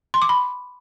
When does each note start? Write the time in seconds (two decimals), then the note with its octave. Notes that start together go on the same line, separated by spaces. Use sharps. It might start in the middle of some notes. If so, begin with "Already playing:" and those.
0.14 C6
0.22 D6
0.29 B5